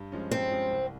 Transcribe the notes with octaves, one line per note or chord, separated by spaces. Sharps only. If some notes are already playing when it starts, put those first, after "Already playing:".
Already playing: G2
F3 G#3 C#4
G2 C4
F3 G#3 C#4
C2